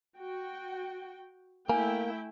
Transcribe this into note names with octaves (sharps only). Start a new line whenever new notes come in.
F#4 G5
A3 A#3 E4 G5 G#5